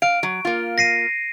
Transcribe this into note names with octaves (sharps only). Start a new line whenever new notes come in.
F5 D7
F#3
A#3 F4
A#6 C7 D#7